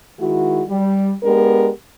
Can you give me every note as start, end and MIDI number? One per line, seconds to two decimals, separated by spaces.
0.19 0.62 51
0.19 0.62 56
0.19 0.62 64
0.19 0.62 66
0.68 1.13 55
1.24 1.70 56
1.24 1.70 59
1.24 1.70 62
1.24 1.70 67
1.24 1.70 70